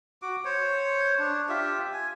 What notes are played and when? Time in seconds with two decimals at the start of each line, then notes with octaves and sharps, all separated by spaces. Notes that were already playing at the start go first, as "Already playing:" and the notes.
0.22 F#4 D6
0.45 C5 C#5
1.19 D4
1.49 F4 G4 E5
1.93 G#5